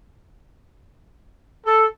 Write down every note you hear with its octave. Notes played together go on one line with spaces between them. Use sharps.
A4